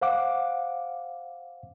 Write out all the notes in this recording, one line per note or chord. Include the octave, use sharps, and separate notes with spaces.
C5 F5 F#5 D6